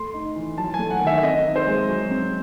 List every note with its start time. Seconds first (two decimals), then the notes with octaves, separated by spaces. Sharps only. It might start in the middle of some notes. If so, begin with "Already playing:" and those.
Already playing: A3 C6
0.14 D#4
0.36 E3
0.58 F#3 A5
0.74 A3 G#5
0.91 F#5
1.01 D#3
1.07 E5
1.23 C4 D#5
1.45 D#4
1.56 C5
1.67 G#3
1.89 F#3
2.11 C4